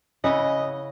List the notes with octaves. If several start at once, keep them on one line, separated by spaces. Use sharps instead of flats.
C#3 E4 D#5 F#5